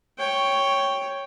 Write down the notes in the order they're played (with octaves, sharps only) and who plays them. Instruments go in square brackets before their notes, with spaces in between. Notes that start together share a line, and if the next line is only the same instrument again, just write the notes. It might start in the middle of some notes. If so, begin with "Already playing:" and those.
[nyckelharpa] C#5 G5